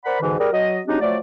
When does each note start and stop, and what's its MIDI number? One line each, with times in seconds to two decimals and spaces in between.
0.05 0.21 70
0.05 0.21 72
0.05 0.21 74
0.05 0.21 78
0.05 0.21 83
0.21 0.38 44
0.21 0.38 47
0.21 0.38 50
0.21 0.38 52
0.39 0.47 55
0.39 0.47 68
0.39 0.47 70
0.52 0.80 54
0.52 0.80 75
0.87 0.98 54
0.87 0.98 56
0.87 0.98 60
0.87 0.98 62
0.87 0.98 63
0.87 0.98 67
1.01 1.18 53
1.01 1.18 54
1.01 1.18 57
1.01 1.18 74